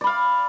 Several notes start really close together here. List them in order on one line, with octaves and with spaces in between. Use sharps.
D5 B5 F5